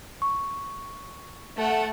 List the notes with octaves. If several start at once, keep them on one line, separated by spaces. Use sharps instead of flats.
C#6
A3 F#5